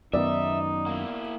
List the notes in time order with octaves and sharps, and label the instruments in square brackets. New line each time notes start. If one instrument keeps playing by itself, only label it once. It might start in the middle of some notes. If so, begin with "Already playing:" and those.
[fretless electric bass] F#2 D#3 [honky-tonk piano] B3 D5 [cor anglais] D#4 [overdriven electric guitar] E5
[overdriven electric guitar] A#3 E4